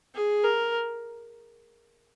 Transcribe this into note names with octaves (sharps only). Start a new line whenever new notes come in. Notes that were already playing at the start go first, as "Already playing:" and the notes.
G#4
A#4